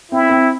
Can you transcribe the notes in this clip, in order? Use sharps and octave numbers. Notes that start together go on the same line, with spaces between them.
C4 E4
C4